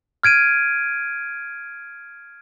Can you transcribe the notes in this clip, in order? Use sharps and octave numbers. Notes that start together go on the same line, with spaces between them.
F6 G#6 D7 D#7